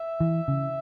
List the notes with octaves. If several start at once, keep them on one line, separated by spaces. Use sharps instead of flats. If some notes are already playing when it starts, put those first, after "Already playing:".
Already playing: E5
E3
C#3